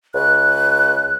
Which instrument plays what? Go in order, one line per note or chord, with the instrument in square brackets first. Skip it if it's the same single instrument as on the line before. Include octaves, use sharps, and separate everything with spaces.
[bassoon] C#2 [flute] F#6